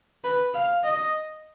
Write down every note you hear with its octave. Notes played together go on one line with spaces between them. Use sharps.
B4
F5
D#5